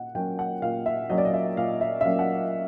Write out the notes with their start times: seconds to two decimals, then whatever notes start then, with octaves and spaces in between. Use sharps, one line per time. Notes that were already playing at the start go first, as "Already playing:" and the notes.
Already playing: A#2 F#5
0.15 F#3 A#3 C#4 G5
0.39 F#5
0.62 A#2 F5
0.86 E5
1.10 F#3 A#3 C#4 D#5
1.18 D5
1.25 D#5
1.34 E5
1.57 A#2 F5
1.81 E5
2.01 E5
2.04 F#3 A#3 C#4 F5
2.19 F#5